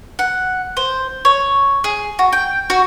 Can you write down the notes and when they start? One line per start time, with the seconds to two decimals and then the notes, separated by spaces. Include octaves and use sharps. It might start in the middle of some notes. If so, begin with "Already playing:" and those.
0.19 F#5
0.77 C5
1.25 C#5
1.84 G#4
2.19 F#4
2.32 G5
2.70 F#4